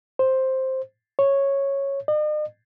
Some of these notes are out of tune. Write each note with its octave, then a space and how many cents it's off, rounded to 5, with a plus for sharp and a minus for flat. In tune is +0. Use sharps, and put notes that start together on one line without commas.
C5 +5
C#5 -5
D#5 -45